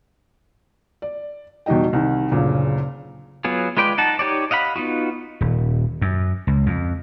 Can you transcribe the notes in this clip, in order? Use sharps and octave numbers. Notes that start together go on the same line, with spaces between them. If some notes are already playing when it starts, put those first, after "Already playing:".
D5
E2 B2 G3 D#4 D#5 G5
C2 D#3
F#1 D2 A#2 C#3
F#3 B3 F4 G#4
G#3 F4 B4 D5 G5
D#4 F#5 A5
D#4 G4 C#5 D5
D#5 F5 F#5 B5
B3 D#4 F4 F#4
D#1
F#2
C#2
F2